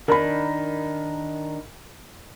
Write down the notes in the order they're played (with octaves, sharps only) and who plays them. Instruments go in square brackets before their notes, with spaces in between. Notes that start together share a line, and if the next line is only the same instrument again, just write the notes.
[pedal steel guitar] D#3 D4 D#4 [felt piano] A#4 B5